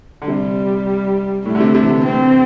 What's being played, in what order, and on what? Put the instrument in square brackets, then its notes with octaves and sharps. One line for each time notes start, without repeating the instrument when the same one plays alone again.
[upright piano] D3
[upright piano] C3 [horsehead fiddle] G3
[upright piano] A2 [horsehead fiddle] A3
[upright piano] D3
C3
C3
E3
D3
[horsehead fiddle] C4